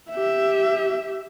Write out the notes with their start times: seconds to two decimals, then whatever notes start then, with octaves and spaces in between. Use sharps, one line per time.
0.10 G4 E5